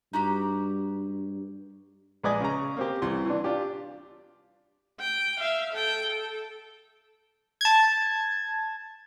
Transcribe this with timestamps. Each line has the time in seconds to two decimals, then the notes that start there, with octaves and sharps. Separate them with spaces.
0.13 G2 D#4 F#4 G4
2.23 A#1 G#3 B4 D5 D#5 G#5
2.40 C#3 A#5
2.77 A#3 C4 G4
3.02 C2 E3 C6
3.26 E3 D4
3.44 D4 F4 G4
5.00 G5
5.40 E5 F5
5.73 A4 G5
6.07 A4
7.61 A5 G#6